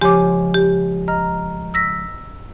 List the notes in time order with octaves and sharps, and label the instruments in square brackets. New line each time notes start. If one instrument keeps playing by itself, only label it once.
[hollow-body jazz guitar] C#2 F3 C6 [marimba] G4 D6 [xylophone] C#5 G#5
[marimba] G4
[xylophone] D#5 A#5 F6
E6 A#6 B6